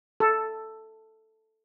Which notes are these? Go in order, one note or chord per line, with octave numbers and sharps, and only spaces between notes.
A4